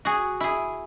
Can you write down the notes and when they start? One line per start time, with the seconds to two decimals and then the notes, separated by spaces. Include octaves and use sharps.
0.05 F#4 G#4
0.40 E4 G#4